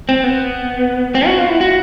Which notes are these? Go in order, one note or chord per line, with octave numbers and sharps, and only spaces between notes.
C4
B3
C4
F#4
F4
E4
F#4